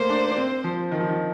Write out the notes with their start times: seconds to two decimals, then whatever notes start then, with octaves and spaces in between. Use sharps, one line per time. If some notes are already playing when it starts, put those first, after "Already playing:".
Already playing: A3 A#3 C5
0.09 D4
0.31 D4
0.37 C4
0.64 F3
0.91 D#3
1.00 F3
1.09 D#3